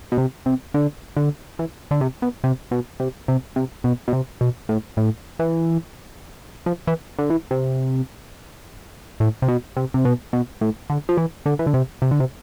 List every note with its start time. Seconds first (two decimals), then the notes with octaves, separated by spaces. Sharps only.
0.12 B2
0.18 C3
0.46 C3
0.74 D3
1.17 D3
1.59 E3
1.91 D3
2.01 C3
2.22 B2
2.44 C3
2.71 B2
3.00 C3
3.28 C3
3.56 C3
3.84 B2
4.08 B2
4.13 C3
4.41 B2
4.69 A2
4.97 A2
5.39 E3
6.66 F3
6.87 E3
7.19 D3
7.30 E3
7.51 C3
9.20 A2
9.42 C3
9.48 B2
9.77 C3
9.94 C3
10.05 B2
10.33 B2
10.61 A2
10.90 D3
11.09 F3
11.17 E3
11.46 D3
11.59 E3
11.67 D3
11.74 C3
12.02 C3
12.11 D3
12.20 C3